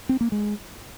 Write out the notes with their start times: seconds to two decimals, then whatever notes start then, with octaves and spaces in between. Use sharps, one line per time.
0.09 C4
0.21 A#3
0.32 G#3